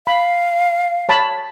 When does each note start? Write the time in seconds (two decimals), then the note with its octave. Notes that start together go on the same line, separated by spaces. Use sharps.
0.07 F5 B5
1.09 C#5 A5 B5